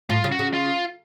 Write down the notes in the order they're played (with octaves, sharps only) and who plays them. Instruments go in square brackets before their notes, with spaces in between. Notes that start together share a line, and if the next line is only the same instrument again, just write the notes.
[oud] A2 [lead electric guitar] F4
[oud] C#3
[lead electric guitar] F#4
[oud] C#3
[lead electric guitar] F4